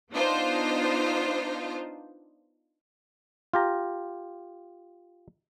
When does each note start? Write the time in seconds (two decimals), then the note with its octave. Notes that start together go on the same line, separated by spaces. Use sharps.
0.11 B3 D4 D#4 F4 C5
3.53 F4 G4 A#5